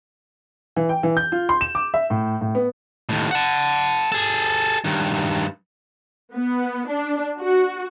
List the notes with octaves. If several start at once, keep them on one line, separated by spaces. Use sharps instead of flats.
E3
G5
E3
G6
F4
C6
E7
D6
E5
A2
A2
B3
D#2 A2
F#5 A5
G#4 A4
G2 D#3
B3
D4
F#4